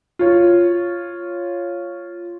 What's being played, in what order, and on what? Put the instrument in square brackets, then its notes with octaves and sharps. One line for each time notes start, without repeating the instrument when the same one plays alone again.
[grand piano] F4 C#5